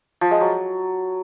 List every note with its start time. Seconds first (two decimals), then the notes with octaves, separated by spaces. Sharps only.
0.21 F3
0.31 G#3
0.41 F#3